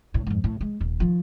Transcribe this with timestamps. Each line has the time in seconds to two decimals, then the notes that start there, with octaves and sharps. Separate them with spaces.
0.14 D2 A2
0.27 F2 G#2
0.44 A2
0.61 G#3
0.80 D#1
1.00 D#3 F3